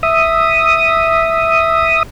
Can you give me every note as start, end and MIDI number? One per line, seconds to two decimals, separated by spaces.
0.03 2.03 76
0.03 2.03 87